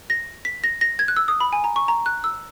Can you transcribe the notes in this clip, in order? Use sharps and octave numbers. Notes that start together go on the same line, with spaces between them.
A#6
B6
A#6
A#6
G#6
F#6
E6
D#6
B5
G#5
A#5
C#6
A#5
F#6
E6